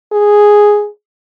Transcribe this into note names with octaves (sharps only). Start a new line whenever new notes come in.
G#4